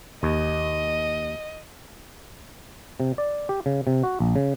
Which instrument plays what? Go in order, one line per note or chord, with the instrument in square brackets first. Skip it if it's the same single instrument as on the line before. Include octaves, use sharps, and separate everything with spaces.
[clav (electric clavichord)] D#2 [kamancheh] D#5
[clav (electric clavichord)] C3
D5
G4
C#3
C3
F#4
A#1
C#3